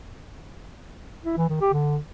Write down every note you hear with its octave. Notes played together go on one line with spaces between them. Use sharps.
E4
E3
D#3
G4
D3